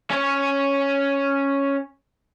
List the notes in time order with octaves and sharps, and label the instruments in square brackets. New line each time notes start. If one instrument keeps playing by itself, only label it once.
[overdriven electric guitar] C#4 C#5